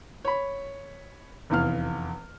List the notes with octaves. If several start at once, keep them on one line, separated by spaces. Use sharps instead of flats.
C#5 B5
F1 E2 F5 F6